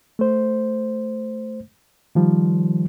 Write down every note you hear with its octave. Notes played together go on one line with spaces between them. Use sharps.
A3 C5
D#3 F3 G3